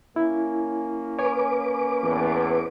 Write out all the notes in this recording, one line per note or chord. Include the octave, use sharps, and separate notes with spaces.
A#3 C#4 E4
B4 C#5 G#5 D6
E2 A2